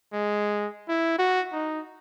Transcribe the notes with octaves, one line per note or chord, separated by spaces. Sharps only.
G#3
E4
F#4
D#4